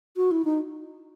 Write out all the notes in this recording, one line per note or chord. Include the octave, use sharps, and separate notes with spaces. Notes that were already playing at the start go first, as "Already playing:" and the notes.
F#4
E4
D#4